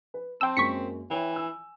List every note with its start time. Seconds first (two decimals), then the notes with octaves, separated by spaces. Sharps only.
0.14 B4
0.41 C4 G5 A5 C6 E6
0.57 F#2 G#3 A#3 C#6 B6 C#7
1.10 E3 C#5 E5 G5
1.32 G#5 E6